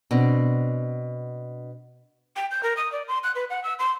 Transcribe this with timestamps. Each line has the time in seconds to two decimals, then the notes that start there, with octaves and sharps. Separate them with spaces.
0.11 B2 C4 D4
2.36 G5
2.51 G6
2.63 A#4
2.77 D#6
2.92 D5
3.08 C6
3.24 F#6
3.35 B4
3.50 F#5
3.64 E6
3.79 C6